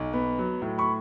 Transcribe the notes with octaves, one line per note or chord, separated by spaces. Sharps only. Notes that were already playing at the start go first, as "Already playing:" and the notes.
Already playing: B1
B3
F#3
A2
B5 C#6